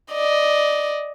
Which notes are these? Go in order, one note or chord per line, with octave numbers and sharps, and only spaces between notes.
D5 D#5